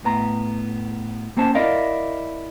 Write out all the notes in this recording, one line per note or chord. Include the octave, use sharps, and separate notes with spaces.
A2 B3 A#5
A#3 C4 C#4 C5 A5
E4 A#4 D5 D#5 F5